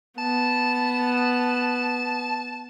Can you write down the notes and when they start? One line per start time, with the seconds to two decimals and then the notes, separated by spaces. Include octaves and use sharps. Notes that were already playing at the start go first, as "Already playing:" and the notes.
0.18 B3 A5